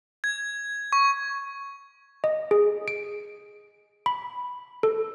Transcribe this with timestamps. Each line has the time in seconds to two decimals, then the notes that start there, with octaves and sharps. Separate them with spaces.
0.24 G#6
0.93 C#6
2.24 D#5
2.51 G#4
2.88 D7
4.06 B5
4.83 A4